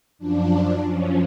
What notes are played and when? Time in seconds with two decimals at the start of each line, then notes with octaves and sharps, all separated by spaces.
0.19 F#2 F3 D4
0.85 F#2 F3 C#4